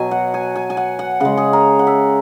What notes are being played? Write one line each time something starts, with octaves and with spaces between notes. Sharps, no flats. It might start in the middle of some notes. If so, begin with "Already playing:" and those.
Already playing: B2 F#3 G#5
F#5
G#5
G#5
G#5
F#5
F#5
C#3 G#3 F#5
G#4
A#4
F#5
E5